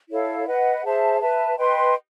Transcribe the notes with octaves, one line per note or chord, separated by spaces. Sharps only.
E4 A4 C#5 F5
B4 D#5 F#5
G#4 C5 E5 A5
B4 E5 A5
B4 D#5 G5 C6